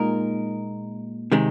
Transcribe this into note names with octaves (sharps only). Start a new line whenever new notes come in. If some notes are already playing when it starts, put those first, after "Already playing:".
Already playing: A#2 G#3 D#4 A#4
C3 D#3 G#3